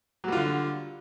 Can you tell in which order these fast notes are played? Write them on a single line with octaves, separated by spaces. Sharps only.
F#3 G3 F4 D3